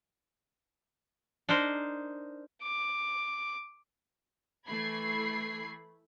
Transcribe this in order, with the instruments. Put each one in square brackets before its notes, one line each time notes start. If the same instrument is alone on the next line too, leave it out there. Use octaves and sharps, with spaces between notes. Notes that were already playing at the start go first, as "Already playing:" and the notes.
[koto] D4 D#4 A#4 C5
[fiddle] D6
[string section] E3 A3 B5 G#6 C7